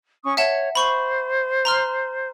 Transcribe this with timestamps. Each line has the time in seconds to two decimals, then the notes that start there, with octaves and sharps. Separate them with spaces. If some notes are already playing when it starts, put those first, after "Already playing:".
0.24 C#4 C#6 D#6
0.37 C#5 E5 F#5 A5
0.75 C5 B5 C#6 F#7
1.65 A#5 C6 F6